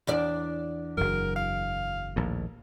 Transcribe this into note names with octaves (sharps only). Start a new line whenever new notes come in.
E2 D4 D5
F#1 F#2 A#4
F5
A#1 D#2 A2